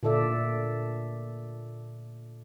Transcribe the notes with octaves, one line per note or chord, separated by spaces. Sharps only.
A#2 D3 A4 D5 E5